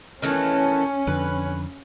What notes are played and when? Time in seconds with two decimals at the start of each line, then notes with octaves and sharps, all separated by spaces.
0.22 D#3 E3 A3 C#4
1.07 F2 D3 B4